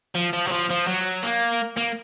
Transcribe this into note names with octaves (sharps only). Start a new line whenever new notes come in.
F3
F3
F#3
F3
F3
F#3
A#3
A#3